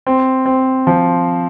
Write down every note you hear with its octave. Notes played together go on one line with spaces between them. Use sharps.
C4
C4
F3